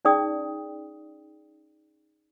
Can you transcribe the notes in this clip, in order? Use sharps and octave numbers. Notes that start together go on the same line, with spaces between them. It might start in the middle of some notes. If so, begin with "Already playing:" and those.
C#4 D#4 G#4 D5 G5 D#6